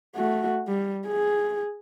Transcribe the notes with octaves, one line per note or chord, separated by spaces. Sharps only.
A3 F#4
G3
G#4